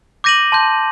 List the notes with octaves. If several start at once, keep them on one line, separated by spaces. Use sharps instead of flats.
D6 G6 A#6 D#7 F#7
A5 C6 G6